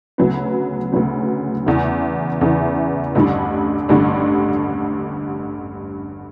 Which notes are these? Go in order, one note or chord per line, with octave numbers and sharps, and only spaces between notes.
D2 C#3 F#3 B3
D2 C#3 F#3 B3
E2 C#3 E3
E2 C#3 E3
A1 G2 D3 G3 D4
A1 G2 D3 G3 D4